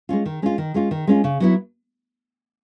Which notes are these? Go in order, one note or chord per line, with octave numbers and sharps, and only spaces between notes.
G#3 C#4 F4
D#3
G#3 C#4 F4
D#3
G#3 C#4 F4
D#3
G#3 C#4 F4
C#3
F#3 B3 E4